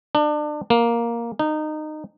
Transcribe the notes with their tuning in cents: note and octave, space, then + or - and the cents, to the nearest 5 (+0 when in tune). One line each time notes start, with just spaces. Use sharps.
D4 +30
A#3 +5
D#4 -20